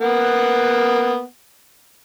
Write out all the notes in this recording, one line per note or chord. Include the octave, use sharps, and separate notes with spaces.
A#3 B3 F#5